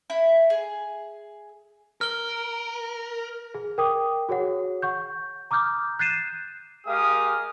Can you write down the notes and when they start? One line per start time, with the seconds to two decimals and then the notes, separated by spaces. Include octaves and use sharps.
0.10 E4
0.50 G#4
2.01 A#4 F6 G7
3.54 G#4
3.78 A#4 G5 D6 D#6
4.29 F#4 G#4 C#5 F#5
4.82 F#5 C#6 G6
5.51 A#5 D6 D#6 F6 G6
5.99 F#6 G6 A6 C7 D#7 E7
6.87 G#3 G4 G#4 A#4 F5 D#6